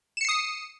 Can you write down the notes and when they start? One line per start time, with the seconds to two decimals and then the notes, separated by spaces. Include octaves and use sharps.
0.17 E7
0.21 C#7
0.25 C7
0.29 D#6